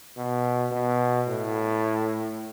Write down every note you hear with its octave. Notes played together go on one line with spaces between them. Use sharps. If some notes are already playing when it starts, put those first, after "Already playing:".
B2
B2
A2